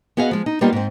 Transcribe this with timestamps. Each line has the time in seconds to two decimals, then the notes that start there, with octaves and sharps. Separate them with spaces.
0.17 B3 F#4 G#4 D#5 F5
0.31 F3 G#3
0.46 D#4
0.61 G3 A#3 B3 D#4 F4 G4
0.73 G#2 C4